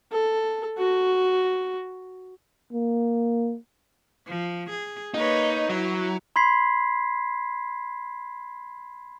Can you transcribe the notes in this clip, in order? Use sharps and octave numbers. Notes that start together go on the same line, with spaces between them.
A4
F#4
A#3
F3
G#4
A#3 D#4 B4 C#5
F#3 E4
B5 C6 G#6 B6 C7